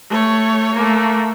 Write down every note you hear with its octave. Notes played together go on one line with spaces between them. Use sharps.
A3 C#5
A3 A#3